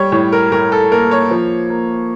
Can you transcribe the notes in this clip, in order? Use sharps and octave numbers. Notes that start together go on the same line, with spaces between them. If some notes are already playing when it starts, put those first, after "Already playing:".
Already playing: G3 C#5
A2 C#5
A#4
A2 A#4
A4
A#3 A#4
C#5
F3
A#3